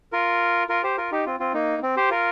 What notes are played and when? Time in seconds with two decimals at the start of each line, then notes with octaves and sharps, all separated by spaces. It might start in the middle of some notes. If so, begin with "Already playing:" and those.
0.12 F4 A#4
0.69 F4 A#4
0.84 G4 C5
0.98 F4 A#4
1.12 D#4 G4
1.26 C4 F4
1.40 C4 F4
1.54 A#3 D#4
1.82 C4
1.97 G4 C5
2.10 F4 A#4